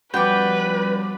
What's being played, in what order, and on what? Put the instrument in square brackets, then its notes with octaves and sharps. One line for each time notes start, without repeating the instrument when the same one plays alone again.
[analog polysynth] F3 G3 C#4 [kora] B3 F#4 [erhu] B4 [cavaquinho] D5 G5